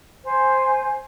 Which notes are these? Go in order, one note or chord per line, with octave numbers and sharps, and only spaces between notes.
C5 G#5